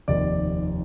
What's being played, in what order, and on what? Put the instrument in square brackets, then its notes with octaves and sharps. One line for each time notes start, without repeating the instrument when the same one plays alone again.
[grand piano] F1 D#2 D#3 D5